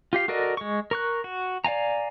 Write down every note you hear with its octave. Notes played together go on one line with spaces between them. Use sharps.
F4 G4 F5
F#4 A4 A#4 D5 D#5
G#3 C#6
A#4 C#6 F#6
F#4
D5 F5 G#5 A#5